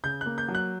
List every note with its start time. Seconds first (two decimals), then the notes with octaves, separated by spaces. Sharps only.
0.04 C#3 G6
0.21 A#3 F#6
0.38 G6
0.48 F#3
0.55 F#6